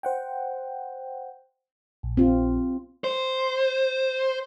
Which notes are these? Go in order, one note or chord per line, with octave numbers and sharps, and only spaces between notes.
C5 F#5 G5
A#1
C4 F4
C5